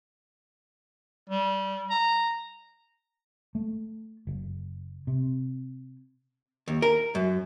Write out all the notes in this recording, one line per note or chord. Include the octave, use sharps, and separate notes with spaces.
G3
A#5
A3
F#1
C3
D#2
A#4
F#2